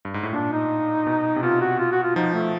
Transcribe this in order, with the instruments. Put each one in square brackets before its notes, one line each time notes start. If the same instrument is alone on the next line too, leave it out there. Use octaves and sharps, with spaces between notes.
[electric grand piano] G2
G#2
A2
[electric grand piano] A#2 [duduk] D4
[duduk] D#4
[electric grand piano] B2
C3
[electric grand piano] B2 [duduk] F4
[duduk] F#4
F4
F#4
F4
[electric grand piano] F3 [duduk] D#4
[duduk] A3